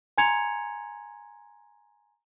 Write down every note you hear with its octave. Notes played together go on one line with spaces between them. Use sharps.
G#5 A#5 C6 G#6 C#7 F7